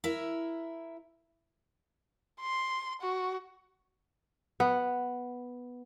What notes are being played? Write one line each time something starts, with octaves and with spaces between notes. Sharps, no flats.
E4 A#4 E5
C6
F#4
B3